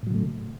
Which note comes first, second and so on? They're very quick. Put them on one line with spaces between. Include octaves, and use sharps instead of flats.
A2 F#3 C#3 A3